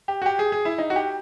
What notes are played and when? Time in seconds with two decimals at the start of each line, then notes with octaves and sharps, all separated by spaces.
0.08 G4
0.22 F#4
0.26 G4
0.39 G#4
0.52 G#4
0.65 E4
0.78 D#4
0.90 F#4
0.96 G4